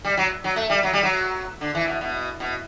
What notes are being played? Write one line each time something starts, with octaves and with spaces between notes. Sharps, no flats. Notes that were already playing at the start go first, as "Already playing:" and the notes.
G3
F#3
F#3
A3
G3
F#3
G3
F#3
D3
E3
B2
B2
B2